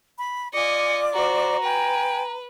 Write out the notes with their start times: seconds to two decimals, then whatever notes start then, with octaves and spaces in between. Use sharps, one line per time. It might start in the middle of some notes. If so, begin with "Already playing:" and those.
0.19 B5
0.54 F4 D5 D#5 G#5 D6 C#7
1.13 F#4 C5 A#5
1.63 B4 G5 G#5